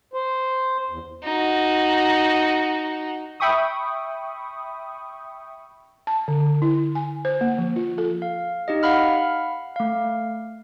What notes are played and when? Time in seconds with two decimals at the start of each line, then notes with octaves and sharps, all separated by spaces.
0.13 C5
0.90 E2
1.24 D#4 F#4
3.40 E5 G5 B5 C#6 D#6
6.07 A5
6.28 D3
6.62 E4
6.95 G#5
7.25 C5
7.41 A#3
7.58 F3
7.76 F4
7.98 A4
8.22 F5
8.68 D#4 G4 D#5
8.83 F5 F#5 B5 F6
9.76 A3 F5